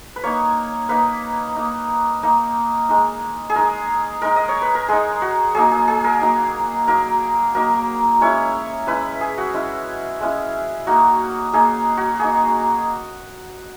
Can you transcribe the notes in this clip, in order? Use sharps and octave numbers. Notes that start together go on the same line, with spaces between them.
B4
A#3 D#4 C#5
A#3 D#4 B4
A#3 D#4
A#3 D#4
G#3 D#4
G#4
G#3 D#4 A#4
G#3 D#4 A#4
D#5
C#5
B4
A#4
G#3 D#4 G#4
F#4
F#3 A#3 D#4 G#4
G#4
G#4
A#4
F#3 A#3 D#4
F#3 A#3 D#4 A#4
F#3 A#3 D#4 A#4
G#3 C#4 E4 C#5
G#3 C#4 E4 B4
G#4
F#4
G#3 C#4 E4
G#3 C#4 E4
A#3 D#4 F#4
A#3 D#4 G#4
F#4
A#3 D#4 G#4